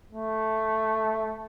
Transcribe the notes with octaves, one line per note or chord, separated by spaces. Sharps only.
A3